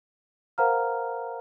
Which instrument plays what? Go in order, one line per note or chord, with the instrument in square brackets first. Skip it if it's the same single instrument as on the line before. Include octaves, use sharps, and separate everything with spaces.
[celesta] A#4 C5 F5 F#5 A#5 F6